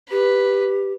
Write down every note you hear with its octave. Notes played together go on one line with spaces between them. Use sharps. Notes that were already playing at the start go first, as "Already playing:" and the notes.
G4 B4